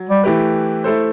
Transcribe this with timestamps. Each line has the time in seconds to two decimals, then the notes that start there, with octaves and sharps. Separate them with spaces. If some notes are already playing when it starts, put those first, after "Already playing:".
Already playing: F#3
0.09 G3
0.23 E3 A3 E4 G4 B4
0.84 A3 E4 A4 C5